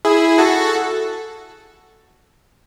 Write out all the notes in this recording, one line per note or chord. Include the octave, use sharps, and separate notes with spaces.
E4 G#4
F#4 A4